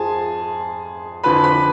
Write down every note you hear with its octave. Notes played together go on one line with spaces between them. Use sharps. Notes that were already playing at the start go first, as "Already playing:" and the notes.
Already playing: F2 F3 G#4 G#5 A5
F2 D3 F3 B4 B5
B4 B5